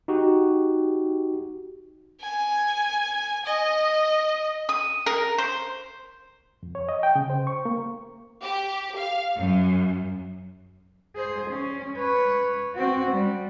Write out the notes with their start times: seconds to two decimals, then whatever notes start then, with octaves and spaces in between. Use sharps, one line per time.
0.08 D#4 F#4 G4
2.21 G#5
3.45 D#5
4.69 D#6
5.06 A#4
5.38 C5
6.63 F2
6.75 C#5
6.89 D#5
7.03 G5
7.16 C#3
7.30 C5
7.47 C#6
7.65 A#3
8.43 G4
8.97 F5
9.36 F#2
11.16 G#4 C5
11.50 C#4
11.97 B4 C#5
12.76 C4 F#4
13.10 G3